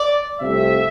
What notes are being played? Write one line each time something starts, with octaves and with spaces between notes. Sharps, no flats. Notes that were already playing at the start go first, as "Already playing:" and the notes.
Already playing: D5
C2 C3 F3 A3 C4 E5